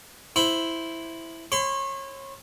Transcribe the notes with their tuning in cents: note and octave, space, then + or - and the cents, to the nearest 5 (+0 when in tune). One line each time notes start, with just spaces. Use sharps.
E4 +0 C5 +0
C#5 -30 C6 -45